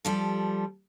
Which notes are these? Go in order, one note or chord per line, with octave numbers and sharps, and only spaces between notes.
F3 G3 A4